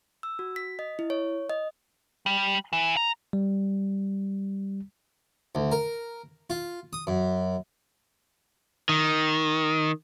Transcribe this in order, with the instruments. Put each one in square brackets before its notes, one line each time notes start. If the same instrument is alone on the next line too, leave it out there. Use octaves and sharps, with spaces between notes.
[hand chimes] E6
F#4
B6
D#5
E4
C#5
D#5
[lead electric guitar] G3
E3
A#5
[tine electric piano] G3
[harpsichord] D2
A#4
F4
D#6
F#2
[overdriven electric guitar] D#3